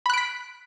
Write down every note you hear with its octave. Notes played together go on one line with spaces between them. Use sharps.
B5 F#6 B6 D7